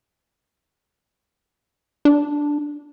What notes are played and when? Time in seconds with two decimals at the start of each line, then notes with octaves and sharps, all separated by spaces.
2.05 D4